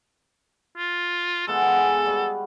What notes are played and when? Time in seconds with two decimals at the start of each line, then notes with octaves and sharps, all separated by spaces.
0.77 F4
1.47 G#3 B3 F4 A4
1.61 G#4 B4 F#5
2.06 G3 B3 F#4